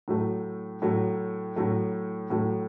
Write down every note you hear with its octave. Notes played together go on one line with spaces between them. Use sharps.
A2 F#3 A3
A2 F#3 A3
A2 F#3 A3
A2 F#3 A3